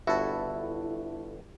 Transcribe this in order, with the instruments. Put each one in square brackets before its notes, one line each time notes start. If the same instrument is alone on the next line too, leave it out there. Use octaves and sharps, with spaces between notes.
[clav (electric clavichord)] G1 F#4 [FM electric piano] E4 A4